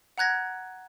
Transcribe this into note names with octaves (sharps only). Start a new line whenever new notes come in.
F#5 A#5 F#6 G#6 A#6